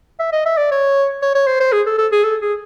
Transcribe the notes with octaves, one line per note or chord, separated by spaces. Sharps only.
E5
D#5
E5
D5
C#5
C#5
C#5
C5
C5
G#4
A4
A4
G#4
A4
G#4